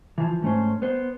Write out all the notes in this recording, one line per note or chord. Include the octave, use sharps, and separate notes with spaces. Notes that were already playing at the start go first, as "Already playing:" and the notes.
E3 F3
G#2 A3 C#4 C5
B3 C5